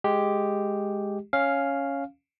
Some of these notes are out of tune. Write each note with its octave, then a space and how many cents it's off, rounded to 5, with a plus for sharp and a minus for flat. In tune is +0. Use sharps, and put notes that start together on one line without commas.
G#3 +0 G4 +0
C#4 +0 F5 +0